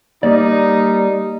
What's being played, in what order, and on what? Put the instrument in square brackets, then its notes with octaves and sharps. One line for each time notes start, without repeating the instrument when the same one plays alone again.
[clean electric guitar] G3 A#3 D5 [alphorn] D#4